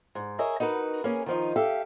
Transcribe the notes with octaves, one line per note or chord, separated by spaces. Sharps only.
G#2
G#4 A#4 C#5 D#5 E5 G#5
D#4 F#4 A#4 B4
A#3 C#4 G#4
D#3 F3 D#4
G4 A4 E5 F5